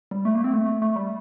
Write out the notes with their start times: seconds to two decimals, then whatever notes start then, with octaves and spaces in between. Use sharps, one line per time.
0.11 G3
0.25 A3
0.35 A#3
0.44 C4
0.54 A3
0.82 A3
0.96 G3